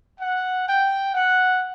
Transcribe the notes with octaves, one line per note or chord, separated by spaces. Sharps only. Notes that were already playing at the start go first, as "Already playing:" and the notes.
F#5
G5
F#5